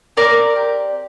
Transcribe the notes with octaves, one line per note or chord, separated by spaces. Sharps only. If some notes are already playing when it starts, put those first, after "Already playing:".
C4 A#4 D5
G4